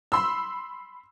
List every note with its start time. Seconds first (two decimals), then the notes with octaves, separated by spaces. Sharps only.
0.12 B5 C6 E6